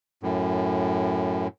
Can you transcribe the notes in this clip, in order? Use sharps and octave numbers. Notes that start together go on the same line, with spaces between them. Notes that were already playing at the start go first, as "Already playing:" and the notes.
F#2 A2